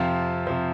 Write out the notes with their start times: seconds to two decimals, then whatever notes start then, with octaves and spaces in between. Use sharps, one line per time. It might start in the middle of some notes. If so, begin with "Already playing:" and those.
Already playing: F2 C3 F3 F4
0.47 C3 F3